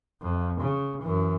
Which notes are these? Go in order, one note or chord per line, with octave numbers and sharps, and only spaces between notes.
F2
C#3
F#2 E3